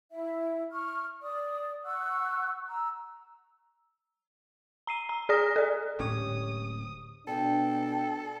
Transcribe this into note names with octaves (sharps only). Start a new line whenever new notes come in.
E4 E5
C#6 F6
D5 D#6
F#5 C#6 E6 F#6
A#5 E6
A#5 C7 D#7
A#5
G#4 D5 A#5 D#6 F6 A#6
A4 D5
D1 A2 G#3 C#4 G4 C#5 D#6
B2 D4 A4 G5